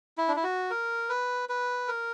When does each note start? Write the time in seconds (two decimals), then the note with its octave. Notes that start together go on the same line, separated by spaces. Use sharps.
0.18 E4
0.28 D4
0.36 E4
0.44 F#4
0.70 A#4
1.09 B4
1.49 B4
1.88 A#4